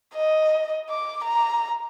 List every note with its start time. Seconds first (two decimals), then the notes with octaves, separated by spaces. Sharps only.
0.15 D#5
0.89 D6
1.24 A#5